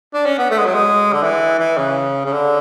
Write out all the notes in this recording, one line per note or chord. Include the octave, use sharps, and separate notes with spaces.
D4
C#4
B3
A3
G#3
F#3
G#3
D3
E3
E3
C#3
C#3
D3